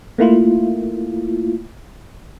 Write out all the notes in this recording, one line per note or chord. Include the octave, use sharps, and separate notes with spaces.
A3 A#3 E4 F4